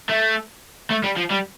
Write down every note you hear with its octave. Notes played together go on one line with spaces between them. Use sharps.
A3
A3
G3
F3
G3